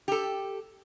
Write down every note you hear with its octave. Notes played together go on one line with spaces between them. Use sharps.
G4 A4